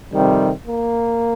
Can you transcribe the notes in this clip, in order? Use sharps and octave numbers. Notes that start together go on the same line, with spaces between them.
F2 C3 D#3 G3
A#3